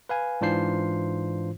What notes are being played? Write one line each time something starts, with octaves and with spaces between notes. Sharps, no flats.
B4 F5 G#5
G#2 E3 D4 F4 C5 C7